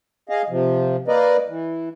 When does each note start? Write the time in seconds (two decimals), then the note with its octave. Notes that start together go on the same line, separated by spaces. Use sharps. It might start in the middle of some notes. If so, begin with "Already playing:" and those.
0.29 G#4 D#5 F5
0.50 C3 F3
1.08 A#3 A#4 B4 D5 D#5
1.48 E3